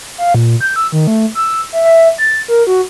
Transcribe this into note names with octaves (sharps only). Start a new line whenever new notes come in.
F5
A#2
G6
E6
D#3
A3
E6
E5
E5
A6
A#4
F#4